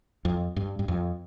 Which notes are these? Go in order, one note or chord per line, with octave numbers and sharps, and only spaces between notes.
F2
G2
G2
F2